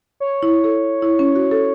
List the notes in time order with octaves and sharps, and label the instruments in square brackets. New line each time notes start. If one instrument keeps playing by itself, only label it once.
[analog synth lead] C#5
[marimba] E4
A4
E4
C#4
F#4
A4